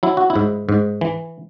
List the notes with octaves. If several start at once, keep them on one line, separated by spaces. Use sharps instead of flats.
F#3 E4
F#4
E4
G#2
G#2
E3